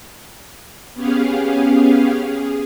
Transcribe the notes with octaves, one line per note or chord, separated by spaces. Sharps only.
B3 C#4 G4 G#4 F5
G#4